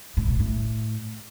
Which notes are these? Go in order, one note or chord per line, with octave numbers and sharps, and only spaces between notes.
A2
A#2
A2